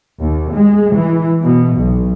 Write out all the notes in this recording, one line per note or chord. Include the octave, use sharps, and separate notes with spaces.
D#2
G#3
E3
B2
B1